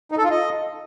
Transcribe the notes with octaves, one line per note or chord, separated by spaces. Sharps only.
D#4
A4
F4
D#5